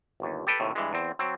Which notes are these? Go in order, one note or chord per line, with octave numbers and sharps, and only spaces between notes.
G1 D#2
G4 A4 B4 G5
D#2 A2 C3
G2 E3 G#3
E2 C4
F#3 C4